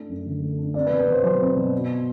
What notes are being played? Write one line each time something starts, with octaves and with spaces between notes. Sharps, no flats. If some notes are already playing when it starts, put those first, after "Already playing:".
Already playing: A3 D4
F#2
D3
A3
D4
C4 D5
B2 B4
B4
B2 C5
F#3 C5
C4
B2
B3